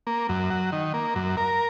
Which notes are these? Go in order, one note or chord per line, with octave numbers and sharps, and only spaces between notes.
A#3
F#2
F#3
D#3
A#3
F#2
A#4